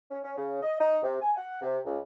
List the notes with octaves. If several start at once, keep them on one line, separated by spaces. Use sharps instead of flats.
C#4
C#4
C#3
D#5
D#4
C3
G#5
F#5
C3
C#2